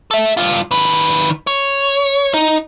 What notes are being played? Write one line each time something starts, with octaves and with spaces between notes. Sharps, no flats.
A4 E5
G2 F4
D#3 B4
C#5
D#4